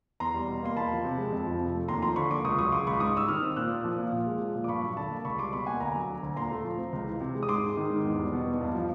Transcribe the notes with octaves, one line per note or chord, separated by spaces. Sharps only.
E2 A#5 C6
G3
B2
A#3 C6
E2 A5 B5
F3
C3
G#3
F2
F3
C3
A3
D#2 A#5 C6
F3 A#5 C6
D3 B5 C#6
A#3 C6 D6
C#2 C#6 D#6
F#3 C#6 D#6
C#3 C6 D6
C#2 B5 C#6
D6
G#2 C#6 D#6
G3 E6
D#3 D#6 F6
C4
A#2 E6 F#6
A#3
F3
A#2
A#2
G#3
F3
A#2
D6
G2 B5 C#6
F#3
D3 A5 B5
A#3
C#2 B5 C#6
G3 C6 D6
B2 B5 C#6
A#3 F#5 G#5
D2 G#5 A#5
F#3
D3
D2
A#2 A#5 C6
A3
F3
C4
C#2
E3
C3
G#3
D#6
G#2 C6 D6
G#3
D#3
G#2
E2
G3
B2
E2
G2
F3